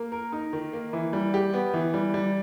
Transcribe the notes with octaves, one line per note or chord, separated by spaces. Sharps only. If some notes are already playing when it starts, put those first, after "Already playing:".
Already playing: A#3
A#4
D#4
D#3
A#3
E3
G3
G4
B3
E3
G3
G3